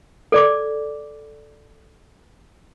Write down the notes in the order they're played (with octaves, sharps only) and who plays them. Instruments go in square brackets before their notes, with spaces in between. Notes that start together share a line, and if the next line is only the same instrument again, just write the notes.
[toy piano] A4 D5 D6